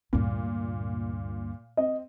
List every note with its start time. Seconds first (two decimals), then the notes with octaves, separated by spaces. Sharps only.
0.13 D2 G2 A#2
1.77 C4 D#5